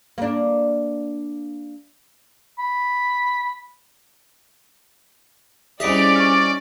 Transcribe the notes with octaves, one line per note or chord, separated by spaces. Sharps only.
A#3 D4
B5
C2 C#4 D#4 G#4 D5 D#5 B6 D7
C#6 F6